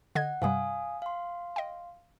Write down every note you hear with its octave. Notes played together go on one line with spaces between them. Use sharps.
D3 D#5 F#5 G#6
G2 C3 G3 F5 G#5 D#6
F5 C6
D#5 G5